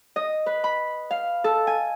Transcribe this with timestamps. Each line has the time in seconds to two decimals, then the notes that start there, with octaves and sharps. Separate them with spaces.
0.16 D#5
0.46 B4
0.64 B5
1.11 F5
1.44 A4
1.67 G#5